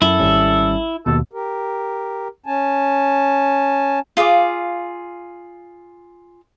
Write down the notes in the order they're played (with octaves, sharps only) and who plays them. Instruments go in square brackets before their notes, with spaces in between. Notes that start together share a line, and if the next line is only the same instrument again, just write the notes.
[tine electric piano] F#2 [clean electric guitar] E4 [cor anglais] A4
[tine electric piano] G#1 G3 C#4
[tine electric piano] D#2 B2 [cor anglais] A4
[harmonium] G4 A#4
C#4 G#5 A5
[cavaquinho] F4 G#4 F5 D6